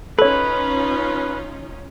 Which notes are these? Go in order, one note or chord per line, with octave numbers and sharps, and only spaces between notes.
C#4 D#4 F4 A4 B4 C#5